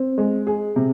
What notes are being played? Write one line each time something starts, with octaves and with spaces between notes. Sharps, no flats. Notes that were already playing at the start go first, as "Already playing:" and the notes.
Already playing: C4
G#3
G#4
C3